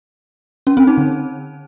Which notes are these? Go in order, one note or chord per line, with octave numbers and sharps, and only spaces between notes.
C#4
C4
D#4
D3